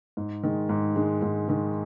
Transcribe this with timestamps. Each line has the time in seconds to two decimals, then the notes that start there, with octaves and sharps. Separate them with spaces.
0.17 G#2
0.43 D#3 G#3
0.69 G#2
0.96 D#3 G#3
1.22 G#2
1.48 D#3 G#3